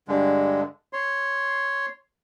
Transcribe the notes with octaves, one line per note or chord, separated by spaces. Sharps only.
G2 D3 G#3
C#5 C6